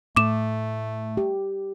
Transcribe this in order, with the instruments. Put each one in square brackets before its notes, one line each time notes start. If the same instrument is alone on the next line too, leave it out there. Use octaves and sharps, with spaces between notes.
[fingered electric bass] A2 [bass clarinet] A3 [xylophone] D6 E7
[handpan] G4